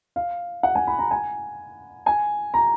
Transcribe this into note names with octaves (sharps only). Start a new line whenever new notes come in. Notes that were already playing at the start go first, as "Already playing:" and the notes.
F5
F#5
G#5
B5
A#5
G#5
G#5
A#5